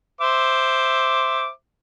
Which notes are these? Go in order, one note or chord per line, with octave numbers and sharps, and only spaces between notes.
C5 E5 D6